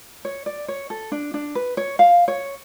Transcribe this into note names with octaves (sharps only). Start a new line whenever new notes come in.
C#5
D5
C#5
A4
D4
D4
B4
C#5
F5
C#5